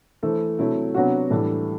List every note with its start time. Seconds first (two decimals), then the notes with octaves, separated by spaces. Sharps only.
0.23 E3 A3 E4 A4 C5
0.59 C3 F#3 A3 E4
0.94 C3 F#3 B3 D4 F#4
1.30 A2 E3 G3 D4 A4